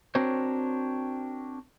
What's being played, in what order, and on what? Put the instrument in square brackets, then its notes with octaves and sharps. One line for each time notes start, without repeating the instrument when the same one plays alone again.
[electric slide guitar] C4 D4 F#4 A#4 C5 C#5